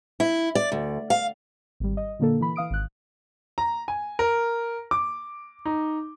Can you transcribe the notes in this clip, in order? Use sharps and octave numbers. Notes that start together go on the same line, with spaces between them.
E4
D5
D2
F5
G#1 G3
D#5
A#2 D3 A#3 A4
E3 B5
E3 F5 D#6 D7
G#1 F#6
A#5
G#5
A#4
D6
D#4